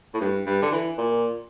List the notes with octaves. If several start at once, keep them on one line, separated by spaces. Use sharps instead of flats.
A2
G2
G2
D3
E3
A#2